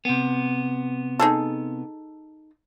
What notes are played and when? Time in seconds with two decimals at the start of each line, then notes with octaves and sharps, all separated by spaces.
0.05 C3 B3
1.20 D#4 G#4 A4